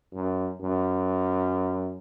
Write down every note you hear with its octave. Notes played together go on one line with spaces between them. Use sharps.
F#2
F#2